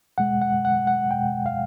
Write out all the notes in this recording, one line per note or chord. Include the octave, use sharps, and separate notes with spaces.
E2 B2 G#3 F#5
F#5
F#5
F#5
E2 B2 G#3 G5
F5